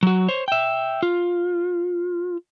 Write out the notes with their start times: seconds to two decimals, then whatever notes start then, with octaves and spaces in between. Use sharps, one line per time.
0.03 F#3 F#4
0.28 C5 C#5
0.48 E5 G5
1.03 F4